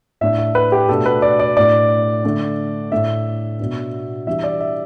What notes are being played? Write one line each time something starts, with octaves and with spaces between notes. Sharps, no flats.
A2 A3 D4 E5
E5
B4
G4
B2 A3 D4 A4
B4
D5
D5
A2 A3 D4 D5
D3 A3 D4
A2 A3 D4 E5
B2 B3 D4
E3 G3 D4 E5
D5
E5